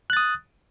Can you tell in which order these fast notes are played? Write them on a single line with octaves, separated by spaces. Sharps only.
F#6 A6 D#6